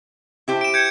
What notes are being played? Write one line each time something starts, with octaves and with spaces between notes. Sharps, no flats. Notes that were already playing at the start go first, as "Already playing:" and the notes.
E4 G4 C5
D7 E7
G6 G#6 C#7